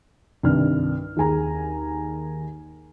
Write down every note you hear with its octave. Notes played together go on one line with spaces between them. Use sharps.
C2 G2 D#3 D4 F6
D#2 G#4 G#5 A#5